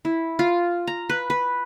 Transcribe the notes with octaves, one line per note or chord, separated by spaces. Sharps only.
E4
F4
A#5
B4
B4